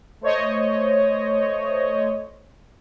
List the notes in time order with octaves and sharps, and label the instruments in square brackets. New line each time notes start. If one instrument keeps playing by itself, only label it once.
[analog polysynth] A3 C5 C#5 D#5